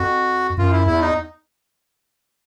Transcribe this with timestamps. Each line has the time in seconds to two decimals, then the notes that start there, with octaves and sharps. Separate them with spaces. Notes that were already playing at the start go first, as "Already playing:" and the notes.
Already playing: F2 F#4
0.58 F#2 F4
0.72 E4
0.86 E2 E4
1.01 D#4